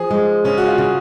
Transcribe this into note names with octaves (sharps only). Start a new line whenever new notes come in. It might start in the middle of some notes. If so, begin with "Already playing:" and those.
Already playing: F3 G#4
G#3
C#3 C#4
F#4
F4
C#3